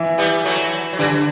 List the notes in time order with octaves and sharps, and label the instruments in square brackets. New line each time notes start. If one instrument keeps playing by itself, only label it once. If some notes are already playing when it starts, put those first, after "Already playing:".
Already playing: [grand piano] E3
[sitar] G3 B3
F#3 A3
F#3
[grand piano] D3 [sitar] E3 G3